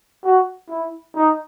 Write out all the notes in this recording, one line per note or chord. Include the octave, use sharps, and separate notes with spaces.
F#4
E4
D#4